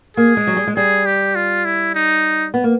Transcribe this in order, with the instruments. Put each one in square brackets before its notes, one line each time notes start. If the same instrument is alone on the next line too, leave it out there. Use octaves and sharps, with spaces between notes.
[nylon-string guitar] A#3 [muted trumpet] G#4
[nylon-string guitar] G#3
F#3
G3
G#3
[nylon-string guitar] G3 [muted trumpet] G#4
[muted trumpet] G4
F4
E4
D#4
[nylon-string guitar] B3
A#3